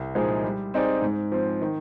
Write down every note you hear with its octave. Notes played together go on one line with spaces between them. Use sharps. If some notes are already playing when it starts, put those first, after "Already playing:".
Already playing: C2
A#2 F3 G#3 D#4
G3
C4 D#4 G#4 D5
G#2
F3 C4
D#3